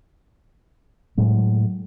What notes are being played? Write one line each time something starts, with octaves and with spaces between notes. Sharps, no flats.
A2 F#3 G#3